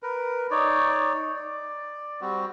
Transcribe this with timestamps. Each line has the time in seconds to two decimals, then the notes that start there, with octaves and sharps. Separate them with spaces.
0.03 A#4 B4
0.51 D#4 C#5 D5
1.36 D5
2.21 G3 C4 F#4